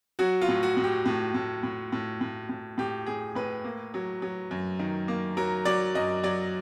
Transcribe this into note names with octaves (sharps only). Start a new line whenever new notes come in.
F#3 F#4
F4
A2
F#4
A2
G4
A2
A2
A2
A2
A2
A2
A2 G4
A2 G#4
A2 B4
A#3
F#3
F#3
F#2
D#3
A#3
F#3 A#4
F#3 D5
F#2 D#5
F#3 D5